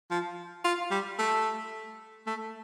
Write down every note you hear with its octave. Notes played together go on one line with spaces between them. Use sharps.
F3
F4
G3
A3
A3